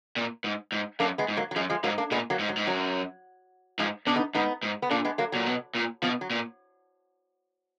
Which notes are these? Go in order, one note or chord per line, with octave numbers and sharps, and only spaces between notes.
A#2
G#2
G#2
F#2 A#3 D4
G#3 B3
G#2
F#3 A#3
F#3
F#2 F3 G#3
F3 G#3
G#2 F#3 A#3
A#3 D4
A#2 G#3 B3
F#3 A#3
G#2
F#3
G#2
F#2 F#3
G#2 F3 G#3
B2 D4
B3 D#4
G#2 B3 D#4
G#2
B3
A#2 A#3 D4
G#3 B3
F#3 A#3
A#2 F#3
B2
A#2
B2 F3
F#3
A#2